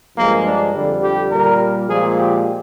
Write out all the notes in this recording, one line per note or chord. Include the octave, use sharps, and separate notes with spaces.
G2 F3 G#3 A#3
D4
F2 D3 G3
G4
A#2 G3 A#4
A#2 F3 G#3 G#4
G4